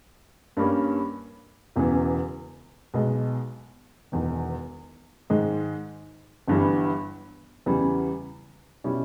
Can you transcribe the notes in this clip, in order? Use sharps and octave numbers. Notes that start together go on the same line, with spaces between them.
G2 G3 A#3 C#4
E1 E2 C#3 E3
B1 B2 G#3
E1 E2 D#3
G#2 D#3 G#3
G1 G2 E3 G3
E2 C#3 E3 G3
B2 G3 C#4 E4